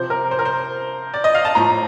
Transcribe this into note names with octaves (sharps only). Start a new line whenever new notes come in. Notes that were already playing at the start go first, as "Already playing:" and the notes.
Already playing: C3 F3 C5
A#4
C5
A#4
C5
D5
D#5
F5
A5
A2 F3 A#5